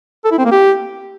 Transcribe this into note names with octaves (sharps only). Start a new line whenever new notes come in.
A4
E4
C4
A#3
G4